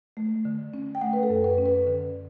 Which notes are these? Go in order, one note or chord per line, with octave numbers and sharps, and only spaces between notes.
A3
D3
C#4
G5
A3 F#5
B4
A4
F#2
B4
C#4
B4
D3